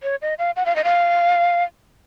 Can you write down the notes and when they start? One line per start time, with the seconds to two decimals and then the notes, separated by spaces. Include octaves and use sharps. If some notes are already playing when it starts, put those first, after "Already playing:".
0.03 C#5
0.22 D#5
0.39 F5
0.56 F#5
0.66 F5
0.76 D#5
0.84 F5